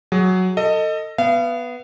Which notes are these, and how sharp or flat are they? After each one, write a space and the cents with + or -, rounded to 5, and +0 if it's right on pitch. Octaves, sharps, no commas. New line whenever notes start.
F#3 +0 G#4 +0
A4 +30 D#5 +0
B3 +0 F5 -40